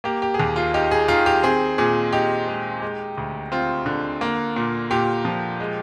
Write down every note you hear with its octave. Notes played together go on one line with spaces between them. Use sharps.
A#3 G4
G4
G#4
D#2 G4
F4
D#4 G4
G#4
D#3 F4
G4
C4 G#4
A#2 G#4
D#4 G4
G#3
G#3
D2
C4 F4
D3
A#3
A#2
A#2 G4
F3
G#3